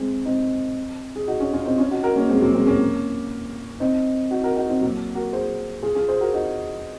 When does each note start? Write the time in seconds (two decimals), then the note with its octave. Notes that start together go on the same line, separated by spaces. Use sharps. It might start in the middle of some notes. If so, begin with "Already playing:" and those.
Already playing: G#3 C4
0.25 C4 D#4
1.16 G#4
1.28 D#4 F#4
1.40 C#4 F4
1.53 C#4 F4
1.65 C4 D#4
1.78 C#4 F4
1.91 D#4 F#4
2.03 F#4 A#4
2.16 A#3 C#4
2.29 G#3 C4
2.41 F#3 A#3
2.53 G#3 C4
2.67 A#3 C#4
3.80 C4 D#4
4.31 D#4 F#4
4.44 F#4 A#4
4.57 D#4 F#4
4.69 C4 D#4
4.81 F#3 A#3
5.15 F#4 A#4
5.33 G#4 C5
5.83 F4 G#4
5.95 F4 G#4
6.08 G#4 C5
6.21 F#4 A#4
6.34 D#4 F#4